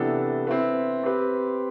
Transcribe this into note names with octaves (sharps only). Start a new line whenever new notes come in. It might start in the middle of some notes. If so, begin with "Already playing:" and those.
Already playing: C3 E3 B3 D4 A4
C4 E4 B4
C4 G4 B4